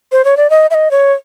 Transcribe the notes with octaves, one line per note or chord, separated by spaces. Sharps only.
C5
C#5
D5
D#5
E5
D#5
C#5